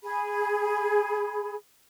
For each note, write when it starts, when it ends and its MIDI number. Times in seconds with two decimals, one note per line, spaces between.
0.03 1.55 68
0.03 1.55 83